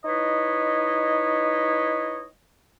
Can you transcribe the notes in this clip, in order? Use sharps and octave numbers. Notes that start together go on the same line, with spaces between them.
D#4 E4 B4 C#5 D#5